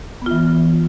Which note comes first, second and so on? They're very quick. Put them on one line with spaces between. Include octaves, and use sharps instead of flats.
B3 F4 E3